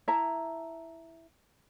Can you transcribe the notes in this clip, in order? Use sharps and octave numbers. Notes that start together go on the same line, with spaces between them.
E4 E5 A5 A#5